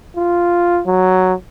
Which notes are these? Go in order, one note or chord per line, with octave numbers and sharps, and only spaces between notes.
F4
F#3